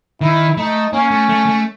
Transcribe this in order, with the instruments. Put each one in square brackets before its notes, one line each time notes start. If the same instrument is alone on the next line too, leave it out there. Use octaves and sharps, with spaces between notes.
[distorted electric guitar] D#3 [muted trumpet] E4
[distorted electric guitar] A3 [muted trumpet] D#4
[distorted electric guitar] A#3 [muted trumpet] C#4
[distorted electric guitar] A3
A3
A3